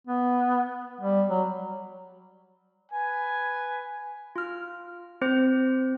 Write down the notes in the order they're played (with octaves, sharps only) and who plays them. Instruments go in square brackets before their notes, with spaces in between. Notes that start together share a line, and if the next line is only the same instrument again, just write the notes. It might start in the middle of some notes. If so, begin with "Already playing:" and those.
[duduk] B3
G3
F#3
[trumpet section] B4 G#5
[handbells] F4 F6
C4 C5